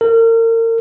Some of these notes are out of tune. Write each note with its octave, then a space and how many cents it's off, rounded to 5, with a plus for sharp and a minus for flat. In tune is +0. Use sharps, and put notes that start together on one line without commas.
A#4 -35